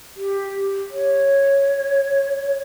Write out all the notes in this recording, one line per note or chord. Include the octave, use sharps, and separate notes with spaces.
G4
C#5